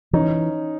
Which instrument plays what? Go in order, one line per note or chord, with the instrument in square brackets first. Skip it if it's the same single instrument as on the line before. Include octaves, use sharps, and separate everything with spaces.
[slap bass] E3 [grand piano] C#4 D#4